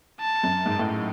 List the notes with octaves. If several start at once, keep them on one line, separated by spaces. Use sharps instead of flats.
A5
F#2
G#2
A2